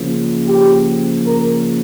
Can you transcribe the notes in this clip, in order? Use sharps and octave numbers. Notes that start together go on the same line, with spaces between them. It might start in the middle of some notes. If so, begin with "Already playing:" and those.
Already playing: C#3 F3 A#3
G4
A#4